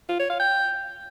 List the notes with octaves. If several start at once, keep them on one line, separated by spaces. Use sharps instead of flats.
F4
C#5
F5
G5